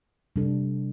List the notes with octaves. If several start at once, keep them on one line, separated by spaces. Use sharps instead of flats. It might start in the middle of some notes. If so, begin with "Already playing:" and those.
C3 G3 D4 A4